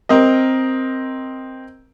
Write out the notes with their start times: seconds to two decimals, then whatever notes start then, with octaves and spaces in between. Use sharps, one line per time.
0.09 C4 A#4 D#5